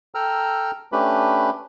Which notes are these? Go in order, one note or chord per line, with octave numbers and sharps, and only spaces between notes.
A4 G5 A#5 E6 F6
A3 C#4 D4 G4 B4 B5